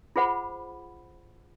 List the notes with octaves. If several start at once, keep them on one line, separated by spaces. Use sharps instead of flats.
F4 G#4 C5 F#5 B5